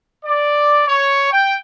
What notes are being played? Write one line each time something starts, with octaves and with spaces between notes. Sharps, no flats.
D5
C#5
G5